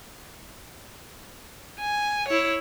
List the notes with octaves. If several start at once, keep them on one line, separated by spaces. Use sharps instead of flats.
G#5
E4 C#5